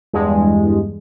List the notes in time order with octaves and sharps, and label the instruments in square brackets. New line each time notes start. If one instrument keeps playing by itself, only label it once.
[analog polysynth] E2 G2 G#3